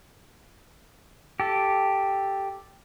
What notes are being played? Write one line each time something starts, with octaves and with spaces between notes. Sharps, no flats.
G4 A4